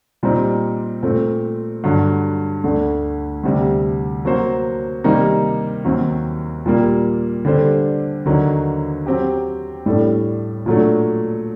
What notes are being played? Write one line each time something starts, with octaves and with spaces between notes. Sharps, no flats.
A#2 G3 C4 D#4
A#2 A3 C4
G2 D3 F#3
D2 D3 A3
D2 C3 G3
F#3 A#3 F#4 C5
C3 D#3 G3 A#3 D#4
D#2 D#3 F#3 C4
A#2 G3 A#3
D3 G3 D4 A4 C5
D#2 D3 F#3 A#3 D#4
F#3 C4 G4
A2 G3 D4 A4
A#2 F#3 A3 D4